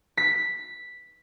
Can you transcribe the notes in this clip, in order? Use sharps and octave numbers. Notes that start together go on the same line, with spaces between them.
B6